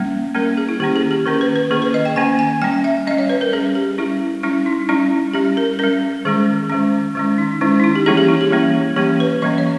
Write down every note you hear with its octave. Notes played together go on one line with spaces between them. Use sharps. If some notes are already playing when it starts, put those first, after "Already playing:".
Already playing: G3 A#3 C#4
G3 A#3 C#4 A#4
G#4
E4
D#3 A#3 C#4 G4
G#4
G4
D#3 A#3 C#4 A#4
B4
B4
D#3 A#3 C#4 G#4
B4
D#5
G5
D#3 A#3 C#4 G#5
G#5
G3 C#4 G5
E5
G3 C#4 D#5
C#5
B4
A#4
G3 C#4 G#4
G4
G3 C#4 E4
G3 C#4 E4
D#4
G3 C#4 E4
G3 C#4 G4
A#4
G3 C#4 A#4
D#3 G#3 C#4 G#4
D#3 G#3 C#4
D#3 G#3 C#4
D#4
D#3 G#3 C#4 E4
D#4
E4
G4
E3 G3 A#3 C#4 G#4
G4
E4
G4
E3 G3 A#3 C#4
E3 G3 A#3 C#4 G4
B4
E3 G3 A#3 C#4 D#5
C#5